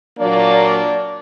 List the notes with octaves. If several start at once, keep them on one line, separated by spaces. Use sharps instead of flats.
A#2 F#3 A#3 D4 D5